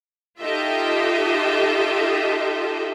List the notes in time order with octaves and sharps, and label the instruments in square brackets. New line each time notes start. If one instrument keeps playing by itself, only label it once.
[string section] D#4 F4 G4 A4 D#5 E5